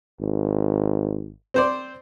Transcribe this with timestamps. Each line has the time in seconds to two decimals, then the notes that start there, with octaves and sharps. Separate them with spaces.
0.20 G#1
1.54 C4 C5 D5